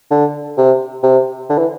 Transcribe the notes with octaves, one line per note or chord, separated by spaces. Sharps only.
D3
C3
C3
D3
E3